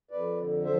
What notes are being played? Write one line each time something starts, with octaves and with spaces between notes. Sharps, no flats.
F2 B4 D5
D3
F3 C5 E5